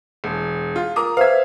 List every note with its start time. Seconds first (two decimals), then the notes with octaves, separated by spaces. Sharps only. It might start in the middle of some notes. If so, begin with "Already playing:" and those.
0.24 E1
0.76 F4
0.96 A#4 A#5 D6 D#6
1.17 B4 C5 E5 F5 G#6